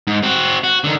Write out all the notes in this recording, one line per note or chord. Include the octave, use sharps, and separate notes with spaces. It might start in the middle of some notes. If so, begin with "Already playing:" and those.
G#2
C4 F#4
F#4
D3 D#3